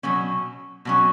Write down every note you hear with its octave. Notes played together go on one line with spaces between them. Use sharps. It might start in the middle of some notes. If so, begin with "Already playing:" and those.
B2 F#3 C#4
B2 F#3 C#4